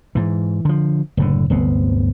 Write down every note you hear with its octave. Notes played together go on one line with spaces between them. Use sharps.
G#2 E3
D3 F3
F#1 A2 D3
D1 G1 C3 B3